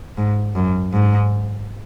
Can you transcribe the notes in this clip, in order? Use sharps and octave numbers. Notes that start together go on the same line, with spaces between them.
G#2
F#2
G#2